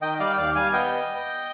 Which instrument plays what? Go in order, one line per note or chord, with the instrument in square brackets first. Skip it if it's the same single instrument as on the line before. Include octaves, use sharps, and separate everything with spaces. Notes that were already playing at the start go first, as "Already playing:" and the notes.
[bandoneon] D#3 D#5 G5
G3 D5 F5
G5
D#2 D5 F5
G3 F5 G#5
B3 D#5 G5